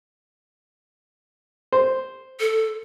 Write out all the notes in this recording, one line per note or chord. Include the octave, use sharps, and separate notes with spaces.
C5
A4